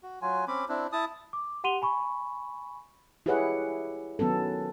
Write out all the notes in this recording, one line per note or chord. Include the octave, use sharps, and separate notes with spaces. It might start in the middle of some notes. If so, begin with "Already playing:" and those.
F#4
F#3 F4 G#5
C4 C#4 B5 D6
C4 D4 E4
E4 A5 D#6
D6
G4 F#5 C6 D#7 F7 G7
G#5 B5 C#6
E4 G4 G#4 B4 C#5 F#5
D#3 F#3 B3 C#4 A4